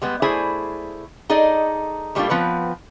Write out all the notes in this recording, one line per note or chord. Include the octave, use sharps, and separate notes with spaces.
G3 G#3 B3
A3 E4 G#4 C5 D5 G#5
D#4 G#4 A4 D5 D#5
A2 G3 A3 A#3 D4 F4
F3 B3 C4 B4 C#5